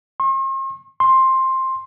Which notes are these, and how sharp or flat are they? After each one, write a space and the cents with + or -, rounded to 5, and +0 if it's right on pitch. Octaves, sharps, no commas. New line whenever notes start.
C6 +45
C6 +10